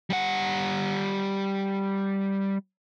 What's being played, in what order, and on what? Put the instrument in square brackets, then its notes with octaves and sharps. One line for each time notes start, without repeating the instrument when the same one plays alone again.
[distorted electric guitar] G3 F#5